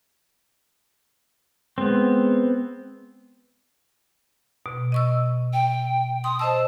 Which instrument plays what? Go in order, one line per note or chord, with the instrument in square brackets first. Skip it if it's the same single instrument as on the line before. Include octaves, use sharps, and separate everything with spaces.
[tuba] G#3 [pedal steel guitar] B3 C4
[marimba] B2
D#5 C#6 E6
[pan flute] G5
[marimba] C6 [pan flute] D#6
[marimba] C5 D#5 E6 [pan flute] A5